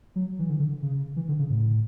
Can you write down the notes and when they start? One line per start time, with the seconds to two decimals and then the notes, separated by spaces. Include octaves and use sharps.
0.16 F#3
0.39 E3
0.50 D3
0.60 D3
0.82 C#3
1.16 E3
1.28 D3
1.39 C#3
1.50 A2